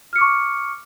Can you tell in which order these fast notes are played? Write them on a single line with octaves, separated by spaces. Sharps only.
F6 C#7 D6 C#6